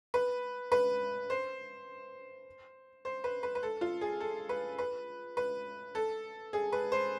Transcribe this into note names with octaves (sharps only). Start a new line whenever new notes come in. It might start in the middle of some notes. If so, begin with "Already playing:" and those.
B4
B4
C5
C5
B4
B4
B4
A4
F4
G#4
A4
B4
B4
B4
A4
G#4
B4
C5